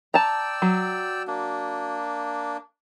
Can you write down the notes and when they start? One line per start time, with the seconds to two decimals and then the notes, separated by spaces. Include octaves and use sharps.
0.14 D5 G5 A5 A#5 E6
0.62 F#3
1.27 A#3 D4